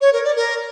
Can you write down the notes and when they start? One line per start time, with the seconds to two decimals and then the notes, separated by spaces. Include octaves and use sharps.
0.01 C#5
0.13 A#4
0.24 D5
0.36 A#4